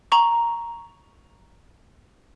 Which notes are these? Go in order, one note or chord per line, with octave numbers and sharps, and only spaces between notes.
A#5 C#6